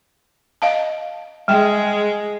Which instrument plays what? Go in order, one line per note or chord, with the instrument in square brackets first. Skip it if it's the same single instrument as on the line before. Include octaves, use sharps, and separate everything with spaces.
[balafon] D#5 F5 A5
[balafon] G3 G5 [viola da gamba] G#3 G#4